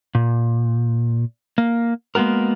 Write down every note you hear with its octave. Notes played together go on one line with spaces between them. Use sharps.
A#2
A#3
G#3 A#3 B3 F#4 A#4